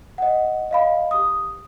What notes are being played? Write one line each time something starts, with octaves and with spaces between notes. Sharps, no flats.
D#5 F#5
D#5 F5 B5
G4 D#6